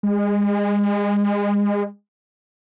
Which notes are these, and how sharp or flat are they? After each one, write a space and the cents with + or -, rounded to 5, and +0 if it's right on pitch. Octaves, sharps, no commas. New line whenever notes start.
G#3 -30